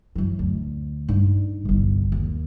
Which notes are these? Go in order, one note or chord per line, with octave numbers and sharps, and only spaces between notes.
F#2 E3
D2
G2 D#4
G1 C2
D#2